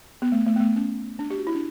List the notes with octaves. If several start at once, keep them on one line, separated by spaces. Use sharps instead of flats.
B3
A3
A3
B3
A3
C#4
D4
G4
F#4
E4
D4